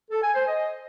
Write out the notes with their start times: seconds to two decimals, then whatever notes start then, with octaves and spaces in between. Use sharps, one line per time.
0.11 A4
0.23 G#5
0.35 C5
0.47 D#5